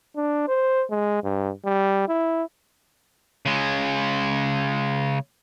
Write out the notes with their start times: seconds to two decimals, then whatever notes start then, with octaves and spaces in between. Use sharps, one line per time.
0.16 D4
0.48 C5
0.90 G#3
1.23 G2
1.65 G3
2.09 E4
3.46 C#3 G#3